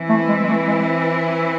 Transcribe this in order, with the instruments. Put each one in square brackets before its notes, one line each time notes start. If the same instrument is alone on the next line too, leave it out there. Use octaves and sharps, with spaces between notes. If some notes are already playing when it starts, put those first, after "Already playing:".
Already playing: [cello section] E3 C4 E4
[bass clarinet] A3
G#3
G#3
A3
G#3